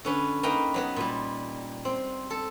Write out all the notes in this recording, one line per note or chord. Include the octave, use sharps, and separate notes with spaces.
D3 C#4 B4
A#3 D#4 A#4 B4 G5 A#5
F#3 B3 B4
A#2 G3
C4
A4